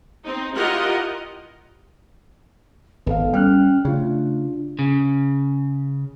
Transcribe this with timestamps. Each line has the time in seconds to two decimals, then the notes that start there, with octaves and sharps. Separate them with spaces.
0.25 C4 D#4
0.56 E4 F4 G4 A#4 D#5 F#5
3.06 G#1 D#3 B3 A4 F5
3.33 G3 C#4 G5 F6 F#6
3.85 C#3 A3 D4 F4
4.79 C#3